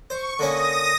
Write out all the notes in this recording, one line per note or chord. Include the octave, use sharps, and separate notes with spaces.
C5 C#6
D3 A#3 C#4 D#6 A#6